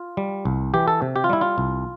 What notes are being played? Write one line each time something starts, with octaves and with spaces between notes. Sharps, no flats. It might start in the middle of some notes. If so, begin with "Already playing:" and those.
Already playing: F4
G3
C2
E3 G4
A4
C3
G4
F4
G3 E4
F4
C2